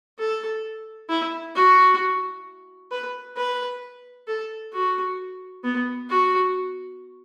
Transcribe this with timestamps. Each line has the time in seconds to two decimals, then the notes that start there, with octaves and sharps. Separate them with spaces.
0.19 A4
1.10 E4
1.55 F#4
2.92 B4
3.37 B4
4.28 A4
4.73 F#4
5.64 B3
6.10 F#4